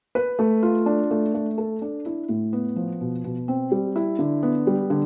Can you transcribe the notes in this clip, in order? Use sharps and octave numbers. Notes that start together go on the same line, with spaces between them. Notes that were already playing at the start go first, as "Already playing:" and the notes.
B4
A3
F4
D4
A3
A3
A4
D4
E4
A2
B3
F3
B2
B2
C4
G3
E4
D3
B3
G3
D3